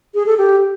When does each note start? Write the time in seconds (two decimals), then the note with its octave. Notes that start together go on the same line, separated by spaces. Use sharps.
0.15 G#4
0.26 A4
0.38 G4